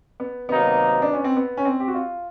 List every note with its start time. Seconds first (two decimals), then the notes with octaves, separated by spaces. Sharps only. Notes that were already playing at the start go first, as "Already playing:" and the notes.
0.20 B3
0.49 C3 D#3 F#3 A#3 B3 D#4
1.02 D4
1.13 C#4
1.24 C4
1.37 B3
1.57 C#4
1.65 C4
1.80 G4
1.88 F#4
1.94 F4